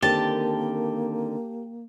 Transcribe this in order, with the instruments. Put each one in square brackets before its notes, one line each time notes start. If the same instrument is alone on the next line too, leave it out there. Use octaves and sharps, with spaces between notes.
[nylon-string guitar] D3 D#3 C4 [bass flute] A#3 [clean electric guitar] G4 [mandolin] A5